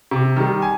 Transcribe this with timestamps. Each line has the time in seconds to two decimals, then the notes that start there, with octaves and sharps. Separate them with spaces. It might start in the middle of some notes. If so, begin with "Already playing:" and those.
0.11 C3
0.36 D#3 G3
0.62 G#5